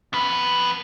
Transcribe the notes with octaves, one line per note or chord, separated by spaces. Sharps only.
F2 B4